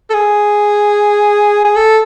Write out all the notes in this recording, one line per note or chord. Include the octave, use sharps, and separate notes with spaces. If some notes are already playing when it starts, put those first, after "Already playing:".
A4
G#4
G#4
A4